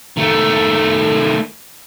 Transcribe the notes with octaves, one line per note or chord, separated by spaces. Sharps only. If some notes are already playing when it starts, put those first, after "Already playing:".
D#3 A3